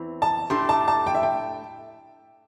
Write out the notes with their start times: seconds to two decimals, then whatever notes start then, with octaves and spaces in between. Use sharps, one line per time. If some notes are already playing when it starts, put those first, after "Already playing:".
Already playing: E2 E3 C4
0.22 A5
0.50 A2 A3 D4 G4 C6
0.69 A5
0.88 A5
1.07 G5
1.15 E5
1.23 G5